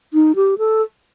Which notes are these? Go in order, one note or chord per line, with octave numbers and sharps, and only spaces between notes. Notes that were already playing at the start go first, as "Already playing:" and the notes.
D#4
G4
A4